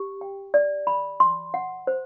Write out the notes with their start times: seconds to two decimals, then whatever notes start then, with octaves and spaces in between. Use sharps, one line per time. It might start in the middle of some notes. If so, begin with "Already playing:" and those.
Already playing: G4
0.21 G5
0.54 D5
0.87 B5
1.20 C6
1.54 F#5
1.87 C5